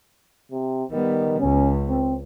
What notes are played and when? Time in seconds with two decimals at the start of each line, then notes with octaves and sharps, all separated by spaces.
0.52 C3
0.91 D#3 G3 B3
1.40 C#2 C#4
1.88 C4